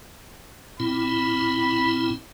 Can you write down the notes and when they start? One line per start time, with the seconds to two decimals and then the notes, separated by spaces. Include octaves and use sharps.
0.80 A#2 C4 E4 B5